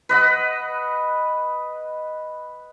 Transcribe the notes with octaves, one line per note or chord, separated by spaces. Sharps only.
B4 D#5 F#5